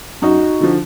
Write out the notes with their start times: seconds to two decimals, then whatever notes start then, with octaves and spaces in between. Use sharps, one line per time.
0.22 F#2 D#4 F#4
0.61 D3 F3